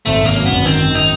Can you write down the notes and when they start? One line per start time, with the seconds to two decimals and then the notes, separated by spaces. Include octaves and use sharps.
0.06 G#1 A3
0.21 G#1 A#3
0.36 F#2
0.46 G#1 B3
0.65 D#3 C4
0.80 D#3
0.95 D#3 D#4